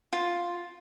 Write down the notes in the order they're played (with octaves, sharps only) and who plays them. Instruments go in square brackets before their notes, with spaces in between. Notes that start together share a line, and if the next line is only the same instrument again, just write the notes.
[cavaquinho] F4